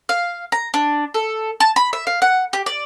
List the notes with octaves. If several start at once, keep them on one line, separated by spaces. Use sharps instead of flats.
F5
A#5
D4
A4
A5
B5
E5
F5
F#5
G4
D5